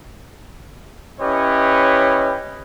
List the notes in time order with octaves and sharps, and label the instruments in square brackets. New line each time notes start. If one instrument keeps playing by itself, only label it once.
[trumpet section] C#4 E4 G4 B4 C#5 D#5